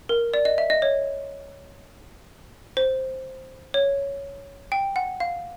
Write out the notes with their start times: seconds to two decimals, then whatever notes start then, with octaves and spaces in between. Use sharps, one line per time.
0.09 A#4
0.34 D5
0.45 D#5
0.58 E5
0.70 D#5
0.82 C#5
2.77 C5
3.74 C#5
4.72 G5
4.96 F#5
5.20 F5